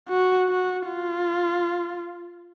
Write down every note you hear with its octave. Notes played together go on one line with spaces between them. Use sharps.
F#4
F#4
F4